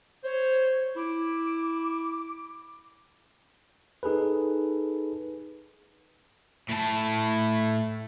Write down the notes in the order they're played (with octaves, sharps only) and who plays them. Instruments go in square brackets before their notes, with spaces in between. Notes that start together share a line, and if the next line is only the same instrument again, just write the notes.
[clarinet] C5 [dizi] C#5
[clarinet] E4 [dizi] D6
[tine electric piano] D#4 G#4 A4 B4
[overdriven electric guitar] A2 A5